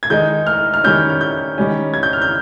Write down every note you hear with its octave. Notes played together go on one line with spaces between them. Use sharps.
G#6
D#3 G#3 D#4 G6
F6
F6
D#3 G3 C#4 G6
F6
G6
D#3 G3 C#4
G#6
G6
F6
G6